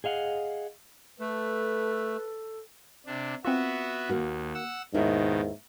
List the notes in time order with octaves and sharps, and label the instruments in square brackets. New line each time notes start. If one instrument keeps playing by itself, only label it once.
[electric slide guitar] G#4 D#5 F5 F#5
[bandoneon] A3 [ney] A4 [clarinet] B4
[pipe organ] C3 D4
[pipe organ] B3 F#4 E5 [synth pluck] C4 F4
[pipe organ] D#2 [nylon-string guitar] A#3 F#4
[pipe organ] F#5 E6
[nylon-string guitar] D#2 E4 A#4 [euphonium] G#2 [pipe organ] B2 D#3